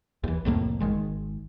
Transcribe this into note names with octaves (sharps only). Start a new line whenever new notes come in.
D#2 E3
C2 F2 A2 A#3
G#1 D#3 G#3